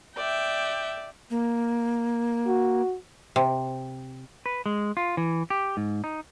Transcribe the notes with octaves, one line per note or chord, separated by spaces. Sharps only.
D5 E5 G5
A#3
F#4
C3
B4
G#3
F4
E3
G4
G#2
D#4